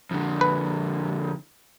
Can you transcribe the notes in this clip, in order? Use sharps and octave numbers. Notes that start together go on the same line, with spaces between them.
F2 D3
B4